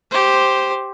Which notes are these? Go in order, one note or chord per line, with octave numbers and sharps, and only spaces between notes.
G4 C5